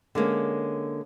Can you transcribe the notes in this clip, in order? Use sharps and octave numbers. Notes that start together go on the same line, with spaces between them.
D3 G#3 A#3 C#4